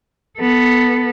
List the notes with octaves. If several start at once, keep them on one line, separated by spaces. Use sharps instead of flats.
B3 A4